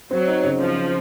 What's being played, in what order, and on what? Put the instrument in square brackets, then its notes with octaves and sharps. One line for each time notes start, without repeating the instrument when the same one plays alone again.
[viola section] F#3 [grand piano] C4
[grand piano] D#4
C#3
[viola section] F3 [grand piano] C4
[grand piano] C4